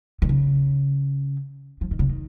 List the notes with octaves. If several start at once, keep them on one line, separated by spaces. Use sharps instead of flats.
D#3
C#3
F3
D#3
C#3
D#3